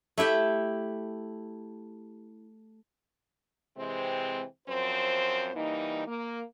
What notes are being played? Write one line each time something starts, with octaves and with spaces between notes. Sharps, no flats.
A3 E4 G4 G5
C3 E3 G#3 C4
F#2 F3 C4 C5
E3 G3 A#3 D#4
A#3